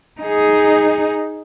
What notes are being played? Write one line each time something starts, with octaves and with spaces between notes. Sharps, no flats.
D#4 G#4